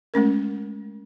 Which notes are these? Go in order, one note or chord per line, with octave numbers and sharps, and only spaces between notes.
G#3 A3 C#4 A#4